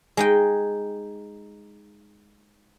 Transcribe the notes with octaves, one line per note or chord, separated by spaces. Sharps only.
G#3 D#4 G5